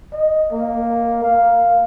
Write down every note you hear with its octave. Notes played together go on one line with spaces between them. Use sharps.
D#5
A#3
F5